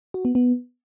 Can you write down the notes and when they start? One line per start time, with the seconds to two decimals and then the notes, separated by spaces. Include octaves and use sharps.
0.14 F#4
0.25 B3
0.35 B3